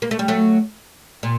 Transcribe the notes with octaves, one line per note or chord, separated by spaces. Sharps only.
A#3
A3
G3
F#3 A3
A#2